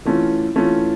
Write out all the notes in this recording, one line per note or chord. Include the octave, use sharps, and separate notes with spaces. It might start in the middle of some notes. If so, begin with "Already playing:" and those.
E3 A3 C#4 F4
E3 A3 C#4 F4